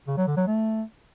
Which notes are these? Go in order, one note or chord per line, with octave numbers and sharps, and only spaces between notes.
C#3
F#3
D3
F#3
A3